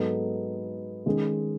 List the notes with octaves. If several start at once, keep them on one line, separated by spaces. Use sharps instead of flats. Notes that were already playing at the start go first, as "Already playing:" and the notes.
Already playing: G#2 F#3 B3 D#4 A4
D#3 G#3 C#4 G#4